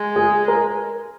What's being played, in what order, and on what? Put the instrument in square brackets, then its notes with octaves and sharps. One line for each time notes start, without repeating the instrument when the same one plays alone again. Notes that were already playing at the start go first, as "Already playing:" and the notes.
Already playing: [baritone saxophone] G#3
[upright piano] G#4
A#4